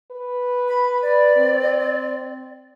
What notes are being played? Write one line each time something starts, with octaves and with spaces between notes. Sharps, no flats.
B4
B5
D5
C4